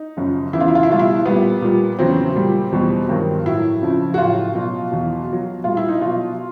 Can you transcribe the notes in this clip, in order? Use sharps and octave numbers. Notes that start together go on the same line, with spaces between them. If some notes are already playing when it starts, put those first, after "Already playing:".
Already playing: D#4
F#2 C#3 F3
E2 C#3 E3 E4
F4
E4
F4
E4
B2 G3 F4
E4
A#2 G3 B3
A#2 G3
E2 C#3 F#3 C4
A#2 G3
E2 B2 G3
G2 D#3 F#3
A2 F#3 E4
F2 C#3 F3
F#4
A2 F#3 F4
B2 F#3
E2 B2 F#3
B2
F#3
A#2 G3 F4
E4
D#4
B2 F#3 F4